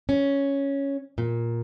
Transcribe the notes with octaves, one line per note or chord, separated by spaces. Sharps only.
C#4
A#2